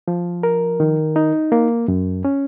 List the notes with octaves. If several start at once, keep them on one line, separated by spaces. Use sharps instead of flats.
F3
A#4
D#3
D#4
A#3
F#2
C#4